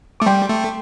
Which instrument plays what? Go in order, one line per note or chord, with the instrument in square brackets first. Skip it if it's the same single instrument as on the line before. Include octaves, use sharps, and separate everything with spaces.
[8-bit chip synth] A3 [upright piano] D6
[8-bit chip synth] G3 [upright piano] G5 C6
[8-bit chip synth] A3